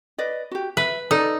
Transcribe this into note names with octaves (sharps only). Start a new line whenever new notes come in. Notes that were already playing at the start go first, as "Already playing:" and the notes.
B4 D5 D#5
F#4 G4
B4 E5
D#4 A4 D5